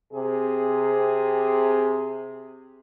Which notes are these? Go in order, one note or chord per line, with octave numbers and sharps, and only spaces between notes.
C3 G#4